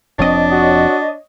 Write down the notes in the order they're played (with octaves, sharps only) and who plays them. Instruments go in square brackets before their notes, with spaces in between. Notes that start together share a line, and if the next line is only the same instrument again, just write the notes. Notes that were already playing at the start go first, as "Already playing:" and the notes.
[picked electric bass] F1 F3 C4 [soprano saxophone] D4 [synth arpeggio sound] C#5 D#5
[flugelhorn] F#4